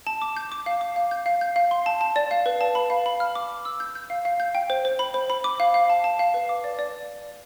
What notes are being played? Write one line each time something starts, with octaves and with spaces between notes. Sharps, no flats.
A5
D6
G6
D6
F5
D6
F5
G6
F5
G6
F5
C6
A5
A5
D5
F5
B4
A5
B5
F5
B5
F6
D6
D6
E6
G6
G6
F5
F5
G6
G5
C5
C5
B5
C5
B5
D6
F5
F5
A5
A5
F5
B4
D6
D5
D5